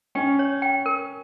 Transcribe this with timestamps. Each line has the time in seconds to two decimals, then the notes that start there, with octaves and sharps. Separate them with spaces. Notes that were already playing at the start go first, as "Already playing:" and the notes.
0.15 C#4 G5
0.39 C#5
0.62 G5
0.86 A#4